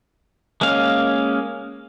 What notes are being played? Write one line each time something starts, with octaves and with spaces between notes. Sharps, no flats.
G#3 A#3 C#4 F5